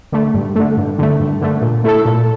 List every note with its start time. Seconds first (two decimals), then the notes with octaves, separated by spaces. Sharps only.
0.12 D3 A3
0.34 G2
0.55 D3 A3
0.77 G2
0.99 D3 A3
1.20 G2
1.41 D3 A3
1.62 A#2
1.84 A3 E4 A4
2.05 A#2